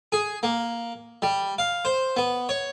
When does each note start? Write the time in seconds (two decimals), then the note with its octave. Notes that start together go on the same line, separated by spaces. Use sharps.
0.12 G#4
0.43 A#3
1.22 G3
1.58 F5
1.85 C5
2.17 B3
2.49 C#5